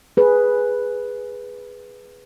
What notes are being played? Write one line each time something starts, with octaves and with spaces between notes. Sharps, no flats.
G#4 B4